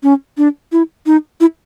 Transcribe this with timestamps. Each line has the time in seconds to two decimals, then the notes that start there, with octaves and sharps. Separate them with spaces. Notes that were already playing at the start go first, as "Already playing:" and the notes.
0.03 C#4
0.38 D4
0.72 E4
1.06 D#4
1.41 E4